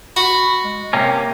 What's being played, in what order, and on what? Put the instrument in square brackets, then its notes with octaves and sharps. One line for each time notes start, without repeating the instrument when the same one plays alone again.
[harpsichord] F#4 [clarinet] B5
[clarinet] G#3
[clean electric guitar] C3 A#3 C#4 [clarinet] G5